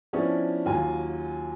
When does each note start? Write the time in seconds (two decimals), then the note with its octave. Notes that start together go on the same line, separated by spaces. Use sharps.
0.13 F3 B3 C#4 D4 E4
0.66 D#2 F#3 F4 G#5